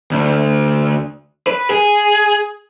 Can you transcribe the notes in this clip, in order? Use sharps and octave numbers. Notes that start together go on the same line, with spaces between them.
D2
B4
G#4